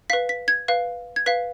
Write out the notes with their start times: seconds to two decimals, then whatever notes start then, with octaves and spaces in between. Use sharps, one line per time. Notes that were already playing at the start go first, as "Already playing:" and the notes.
0.10 B4 F5 B6
0.29 B6
0.48 G#6
0.68 B4 F5
1.16 G#6
1.26 B4 F5 B6